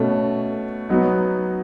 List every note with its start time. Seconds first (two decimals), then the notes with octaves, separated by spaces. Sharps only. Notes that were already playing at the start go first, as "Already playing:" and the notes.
Already playing: B2 A3 C#4
0.89 F#3 B3 D#4